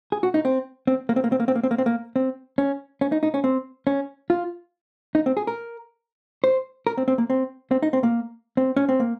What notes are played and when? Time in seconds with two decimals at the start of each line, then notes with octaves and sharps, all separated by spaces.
0.12 G#4
0.23 F#4
0.34 D#4
0.45 C4
0.87 C4
1.09 A#3
1.16 C4
1.24 A#3
1.32 C4
1.40 A#3
1.48 C4
1.55 A#3
1.63 C4
1.71 A#3
1.78 C4
1.86 A#3
2.16 C4
2.58 C#4
3.01 C#4
3.12 D#4
3.23 D#4
3.34 C#4
3.44 C4
3.87 C#4
4.30 F4
5.15 D#4
5.26 C4
5.37 G#4
5.47 A#4
6.44 C5
6.87 A#4
6.97 C4
7.08 C4
7.18 A#3
7.30 C4
7.71 C4
7.82 D#4
7.93 C4
8.03 A#3
8.57 C4
8.76 C#4
8.89 C4
9.00 A#3